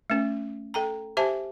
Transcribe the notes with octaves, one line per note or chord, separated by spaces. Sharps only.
A3 C#4
A4 G5 A#5
G4 C5 E5 G#5 A5